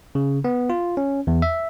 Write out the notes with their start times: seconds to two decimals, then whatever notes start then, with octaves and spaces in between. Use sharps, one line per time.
0.15 C#3
0.44 B3
0.70 F4
0.97 C#4
1.27 E2
1.42 E5